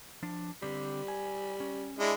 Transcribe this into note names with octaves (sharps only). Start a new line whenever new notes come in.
F3 D4
D3 G3 C4 G4
G#5
C#4
G#3 D4 E4